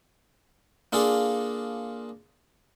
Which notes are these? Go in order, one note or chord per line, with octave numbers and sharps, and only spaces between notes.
A#3 D4 F4 G#4 A4